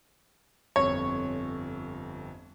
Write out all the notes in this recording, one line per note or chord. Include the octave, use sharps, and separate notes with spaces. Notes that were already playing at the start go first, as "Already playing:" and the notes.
G1 F2 C#5